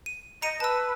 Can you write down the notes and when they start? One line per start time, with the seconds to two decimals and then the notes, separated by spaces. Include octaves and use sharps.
0.06 D#7
0.42 D#5 A#5 C#7 D#7
0.60 B4 A5 E6